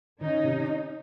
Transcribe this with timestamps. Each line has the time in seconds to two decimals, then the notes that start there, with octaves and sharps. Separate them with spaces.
0.20 D#3 C#4 D#4
0.44 C3